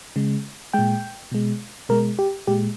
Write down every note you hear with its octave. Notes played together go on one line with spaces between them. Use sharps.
C#3 G#3
A#2 G#3 G5
B2 G#3
B2 G#3 A#4
G4
A#2 G#3 G4